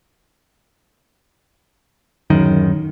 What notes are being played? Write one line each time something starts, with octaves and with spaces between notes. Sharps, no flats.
D1 F#2 D#3